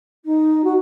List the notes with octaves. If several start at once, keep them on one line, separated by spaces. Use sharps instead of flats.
D#4
F#4